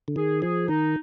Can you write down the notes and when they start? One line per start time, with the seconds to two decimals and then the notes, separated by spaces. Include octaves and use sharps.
0.08 D3
0.16 D#3 G#4
0.41 F3 G#4
0.68 D#3 D#4